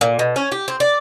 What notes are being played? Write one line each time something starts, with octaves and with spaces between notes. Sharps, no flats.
A#2
B2
C#4
G4
C4
D5